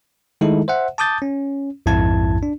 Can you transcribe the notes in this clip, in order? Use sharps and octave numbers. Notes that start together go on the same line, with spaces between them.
D#3 G#3 A3 D#4 E4 A4
C5 E5 F#5
A5 D6 D#6 G6 A6
C#4
A#1 F2 G#2 E4 A5 G#6
D4